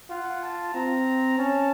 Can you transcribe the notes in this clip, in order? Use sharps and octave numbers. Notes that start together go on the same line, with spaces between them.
F4 F#5
A5
C4 A#5
C#4 A5